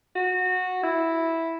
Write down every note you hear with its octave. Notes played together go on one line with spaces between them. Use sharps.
F#4
E4